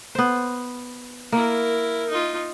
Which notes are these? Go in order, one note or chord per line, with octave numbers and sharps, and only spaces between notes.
B3 C5
A#3 E4 A#4
D#4 F4